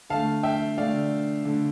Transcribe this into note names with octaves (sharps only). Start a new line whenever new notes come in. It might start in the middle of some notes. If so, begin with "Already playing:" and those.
D3 A3 F5 A5
E5 G5
D3 A3 D5 F5
D3 A3